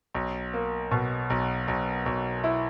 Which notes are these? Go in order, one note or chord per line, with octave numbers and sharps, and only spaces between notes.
B1
A#3
B2
B1
B1
B1
E4